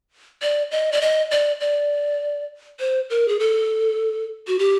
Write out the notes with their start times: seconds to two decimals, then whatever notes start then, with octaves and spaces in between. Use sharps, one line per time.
0.42 D5
0.71 D#5
0.92 D5
1.01 D#5
1.31 D5
1.61 D5
2.80 C5
3.10 A#4
3.28 G#4
3.40 A4
4.48 F#4
4.59 G4